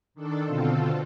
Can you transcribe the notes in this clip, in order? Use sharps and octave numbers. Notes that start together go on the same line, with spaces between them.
D#3 D4 A4
B2 D3 C4 F4 A4